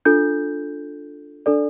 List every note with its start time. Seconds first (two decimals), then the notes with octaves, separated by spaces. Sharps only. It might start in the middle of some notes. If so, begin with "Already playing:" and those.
0.05 D4 F4 A4 G6
1.46 D4 A4 D5